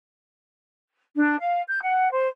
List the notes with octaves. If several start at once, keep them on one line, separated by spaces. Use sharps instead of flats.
D4
F5
G6
F#5
C5